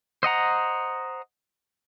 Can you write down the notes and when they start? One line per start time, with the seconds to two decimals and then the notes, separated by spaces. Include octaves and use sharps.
0.23 C5 D#5 F#5 A#5